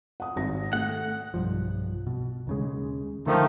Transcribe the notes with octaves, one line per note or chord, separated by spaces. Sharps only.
F#5 D#6
G#1 A#6
A3 F#5
B1 G2 F3
B2
D#2 C#3 G#3
D3 D#3 F3 A3